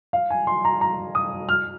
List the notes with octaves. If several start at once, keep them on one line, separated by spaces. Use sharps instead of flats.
F5
G#5
C6
A#5
A#5
D#6
F6